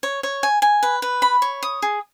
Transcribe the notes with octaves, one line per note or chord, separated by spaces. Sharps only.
C#5
C#5
G#5
G#5
B4
B4
B5
C#5
D#6
G#4